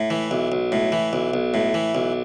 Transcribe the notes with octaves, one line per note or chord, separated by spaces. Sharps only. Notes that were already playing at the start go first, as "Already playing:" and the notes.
Already playing: A2
E3
B1
B1
A2
E3
B1
B1
A2
E3
B1